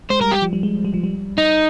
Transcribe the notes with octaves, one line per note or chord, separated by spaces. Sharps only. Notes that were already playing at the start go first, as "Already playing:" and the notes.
G#3 C5
G3 A#4
G4
F3
G3
G#3
G3
F3
G3
D#4